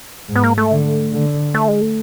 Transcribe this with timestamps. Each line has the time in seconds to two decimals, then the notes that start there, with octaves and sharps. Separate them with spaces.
0.29 G#2
0.36 B3
0.44 A#3
0.58 A3
0.71 D3
1.13 D3
1.54 A3
1.68 G#3
1.81 A3